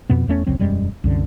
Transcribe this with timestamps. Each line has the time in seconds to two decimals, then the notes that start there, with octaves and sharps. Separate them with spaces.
0.10 F2 B2 B3
0.28 E2 A3 C#4
0.47 F1 C#2 F#3 C4
0.59 E1 F#2 G3 G#3
1.04 C2 F#2 D3